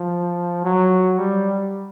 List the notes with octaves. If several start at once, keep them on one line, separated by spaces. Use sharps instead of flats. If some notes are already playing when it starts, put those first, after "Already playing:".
Already playing: F3
F#3
G3